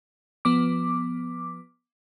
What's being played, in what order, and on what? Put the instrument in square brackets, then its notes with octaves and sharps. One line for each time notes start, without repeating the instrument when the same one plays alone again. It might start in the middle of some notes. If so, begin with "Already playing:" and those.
[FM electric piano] F3 B3 D6